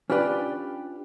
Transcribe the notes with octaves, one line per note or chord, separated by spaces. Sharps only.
C#4 D4 F4 G4 B4 D5